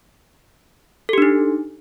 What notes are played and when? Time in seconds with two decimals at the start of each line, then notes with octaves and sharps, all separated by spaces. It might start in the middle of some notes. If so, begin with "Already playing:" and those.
1.09 A4
1.13 G4
1.18 D4
1.22 D#4